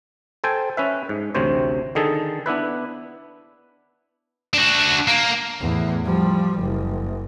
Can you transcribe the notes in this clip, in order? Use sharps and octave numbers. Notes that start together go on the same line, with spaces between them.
A4 C5 G5 G#5
C#4 B4 E5
G#2
A1 D2 C3 C5 C#5
D3 D#3 G#4 A4
B3 D4 E4 B4
D4 F#4
A#3
E2 A2
F3 G3
F#1